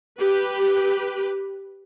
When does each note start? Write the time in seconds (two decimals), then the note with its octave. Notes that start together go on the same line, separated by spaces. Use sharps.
0.20 G4 B4